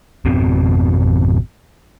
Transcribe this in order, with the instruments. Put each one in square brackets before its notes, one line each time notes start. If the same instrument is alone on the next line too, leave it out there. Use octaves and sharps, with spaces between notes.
[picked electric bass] G#1 F2 B2 C4